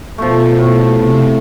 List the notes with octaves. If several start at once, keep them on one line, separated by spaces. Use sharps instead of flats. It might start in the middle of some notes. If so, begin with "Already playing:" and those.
B2 F3 A3
A2
C3